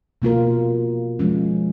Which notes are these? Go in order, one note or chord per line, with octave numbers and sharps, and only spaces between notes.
B2 A#3 F4 A#4
F3 G#3 C#4